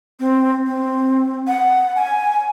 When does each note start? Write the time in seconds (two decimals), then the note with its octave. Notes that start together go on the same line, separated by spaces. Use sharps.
0.20 C4
0.66 C4
1.47 F#5
1.96 G#5